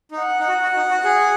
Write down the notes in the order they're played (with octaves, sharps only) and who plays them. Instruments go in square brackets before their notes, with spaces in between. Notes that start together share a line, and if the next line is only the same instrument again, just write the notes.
[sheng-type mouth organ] D#4
[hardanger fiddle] F#5
[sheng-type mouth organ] D#4
F#4
F#4
D#4
F#4
G#4